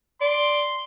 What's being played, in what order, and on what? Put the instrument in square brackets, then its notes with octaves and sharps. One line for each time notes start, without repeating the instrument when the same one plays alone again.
[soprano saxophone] D5 [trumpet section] C6